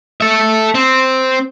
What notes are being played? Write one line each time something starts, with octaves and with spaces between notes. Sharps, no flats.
A4 E5
C4